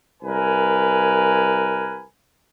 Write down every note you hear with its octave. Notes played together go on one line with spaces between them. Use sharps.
C2 A#4 B4 G#5